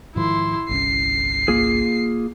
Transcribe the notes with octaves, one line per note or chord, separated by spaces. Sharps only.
G#2 D#3 F3 E4 C6
G1 C2 C#4 C7
A#3 F4 G#4